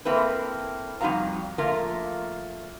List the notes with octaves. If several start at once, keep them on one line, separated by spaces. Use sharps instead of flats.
A#3 C4 E4 A4 B4
F2 G3 D#4 F#4 F5 A#5
F3 A3 A#3 F4 A#4